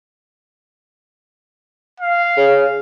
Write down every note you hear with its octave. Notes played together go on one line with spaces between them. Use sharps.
F5
C#3